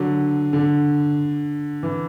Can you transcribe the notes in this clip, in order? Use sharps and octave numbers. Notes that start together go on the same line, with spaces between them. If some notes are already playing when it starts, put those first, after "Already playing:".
Already playing: D3 F#3
D3
E3